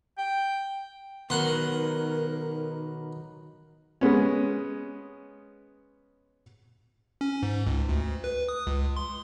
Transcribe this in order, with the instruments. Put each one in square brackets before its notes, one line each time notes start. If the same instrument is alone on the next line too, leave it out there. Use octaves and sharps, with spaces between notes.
[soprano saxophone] G5
[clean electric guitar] B1 B3 [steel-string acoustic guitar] D#3 F#3 D#4 [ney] A#4 [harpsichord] F#5 C6
[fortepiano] G#3 B3 C#4
[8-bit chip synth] C#4
G#2
C#2
D2
B4
D#6
C#2
C6